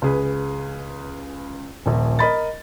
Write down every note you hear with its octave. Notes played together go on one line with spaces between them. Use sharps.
C#2 G#4 B4
D#1 A#1
A#4 D#5 B5 A6